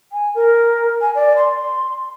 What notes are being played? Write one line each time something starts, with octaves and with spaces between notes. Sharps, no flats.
G#5
A#4
G#5
D5
C6